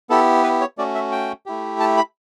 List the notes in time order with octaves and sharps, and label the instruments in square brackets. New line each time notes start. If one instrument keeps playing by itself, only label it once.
[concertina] B3 E4 G4 A4
B4
C#5
A3 C#4 F#4 D5
E5
G5
A3 E4 G4
A5
B5